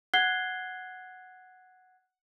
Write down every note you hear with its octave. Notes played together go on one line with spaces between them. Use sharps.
F#5 F#6 G#6 C7 G7